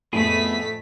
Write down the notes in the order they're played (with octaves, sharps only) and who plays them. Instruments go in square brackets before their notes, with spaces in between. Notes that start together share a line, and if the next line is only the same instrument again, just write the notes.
[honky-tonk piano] F2 A2 [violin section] A3 B6 [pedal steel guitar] B3 E4 G#4